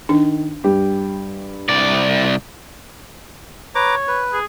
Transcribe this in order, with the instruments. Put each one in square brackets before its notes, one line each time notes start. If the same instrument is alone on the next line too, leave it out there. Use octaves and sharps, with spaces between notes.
[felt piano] D#3 [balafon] D4
[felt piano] G2 G4
[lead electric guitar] C2 D5
[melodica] B4 A#5 D6 [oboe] C#5
[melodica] B4
[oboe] G#4